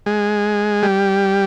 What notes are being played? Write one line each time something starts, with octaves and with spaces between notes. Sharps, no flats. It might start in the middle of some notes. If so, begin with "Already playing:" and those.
G#3
G3